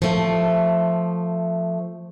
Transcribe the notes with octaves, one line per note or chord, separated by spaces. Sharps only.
F3 A3